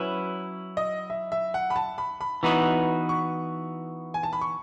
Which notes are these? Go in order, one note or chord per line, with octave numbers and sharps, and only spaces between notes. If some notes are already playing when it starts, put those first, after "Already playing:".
Already playing: F#3 C#4 E4 B4
D#5
E5
E5
F#5
B5
A5
B5
B5
E3 B3 D#4 F#4
C#6
G#5
A5
B5
C#6